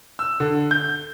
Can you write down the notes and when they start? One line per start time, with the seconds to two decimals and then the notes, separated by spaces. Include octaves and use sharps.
0.19 E6
0.40 D3
0.71 G6